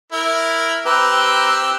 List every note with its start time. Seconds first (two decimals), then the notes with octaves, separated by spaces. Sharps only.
0.12 E4 A#4
0.86 C4 G4 B4 A#5 E6 F#6